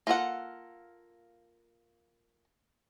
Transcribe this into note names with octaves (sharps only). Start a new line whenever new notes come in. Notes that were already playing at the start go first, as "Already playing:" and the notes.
A#3 F4 A4 F#5